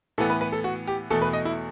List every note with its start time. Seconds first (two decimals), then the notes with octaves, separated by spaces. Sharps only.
0.18 A2 E3 B3 A4
0.30 B4
0.41 B4
0.53 A4
0.64 F#4
0.87 G4
1.10 E2 B2 A3 A4
1.22 B4
1.33 D#5
1.45 E4